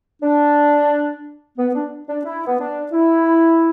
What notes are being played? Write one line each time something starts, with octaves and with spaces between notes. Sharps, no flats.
D4
B3
D4
D4
E4
B3
D4
E4